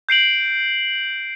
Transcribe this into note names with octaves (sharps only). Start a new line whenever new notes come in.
G6 C7 D7 F#7